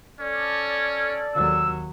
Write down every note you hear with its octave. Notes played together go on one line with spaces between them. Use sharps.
C#4 A4 D5
D#2 F#3 E6